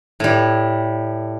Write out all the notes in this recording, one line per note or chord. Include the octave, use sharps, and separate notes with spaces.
A2 G3